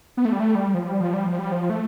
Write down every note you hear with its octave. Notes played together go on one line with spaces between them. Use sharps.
B3
A3
G3
A3
G3
F3
G3
F3
G3
F3
G3
F3
A3